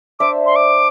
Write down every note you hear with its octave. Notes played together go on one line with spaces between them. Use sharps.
D4 C5 E5 D6
C6
D6